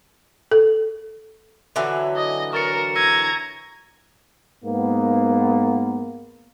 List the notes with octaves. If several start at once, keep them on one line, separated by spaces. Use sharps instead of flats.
A4
D3 E3 F#3
D#5
A#4 C#6 A6 C#7
A#5 E6 G#6 A#6 D#7
G#2 A#3 B3